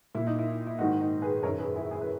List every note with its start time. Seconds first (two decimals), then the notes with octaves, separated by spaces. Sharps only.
0.15 A#2 E4
0.27 D#4
0.39 E4
0.67 E4
0.79 G#2 D#3 D#4 F#4
1.01 D#4
1.22 G#4 B4
1.43 F#2 D#3 A#4 C#5
1.59 G#4 B4
1.76 E4 G#4
1.91 E4 G#4
2.01 B4